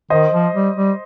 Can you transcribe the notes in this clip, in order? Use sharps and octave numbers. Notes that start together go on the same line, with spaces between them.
D#3 C5 D#5
F3
G3
G3